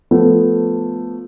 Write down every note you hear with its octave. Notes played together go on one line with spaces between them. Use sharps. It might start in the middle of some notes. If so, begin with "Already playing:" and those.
F3 A3 B3